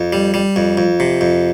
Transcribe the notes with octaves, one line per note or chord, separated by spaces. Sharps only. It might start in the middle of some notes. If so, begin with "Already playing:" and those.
Already playing: F2
G3
G3
F2
F2
C3
F2